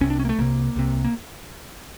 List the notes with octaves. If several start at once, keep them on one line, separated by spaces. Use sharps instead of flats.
C2 C3 C#4
D4
C#4
A#3
A3
C2 C3 A#3
C2 C3
A#3